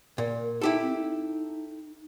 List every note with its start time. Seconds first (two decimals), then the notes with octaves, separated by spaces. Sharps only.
0.18 A#2 A#4
0.61 D#4 E4 G4 A4
0.82 C4
0.98 D#4